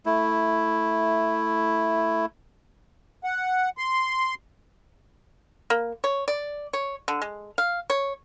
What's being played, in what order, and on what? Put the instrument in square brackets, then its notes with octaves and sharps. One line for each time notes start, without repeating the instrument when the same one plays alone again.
[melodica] A3 E4
[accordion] F#5
C6
[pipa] A#3
C#5
D5
C#5
D3
G#3
F5
C#5